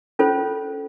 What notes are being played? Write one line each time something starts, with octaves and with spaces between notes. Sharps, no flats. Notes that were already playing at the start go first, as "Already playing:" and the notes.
C#4 F4 A4 C5